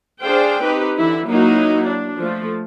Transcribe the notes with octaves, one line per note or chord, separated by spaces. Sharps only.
D4 G#4 C5 F5 G5
C4 D#4 G4 B4
D3 E3 E4
F#3 A#3 D#4 E4 F#4
D4
F3 A3